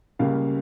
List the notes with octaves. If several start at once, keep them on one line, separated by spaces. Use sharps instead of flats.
C#2 C#3 G3 A#3 F5